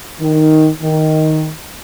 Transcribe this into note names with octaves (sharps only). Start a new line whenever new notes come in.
D#3
D#3